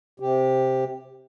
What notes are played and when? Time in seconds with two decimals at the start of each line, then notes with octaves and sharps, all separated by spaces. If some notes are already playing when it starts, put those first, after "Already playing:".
0.20 C3 G4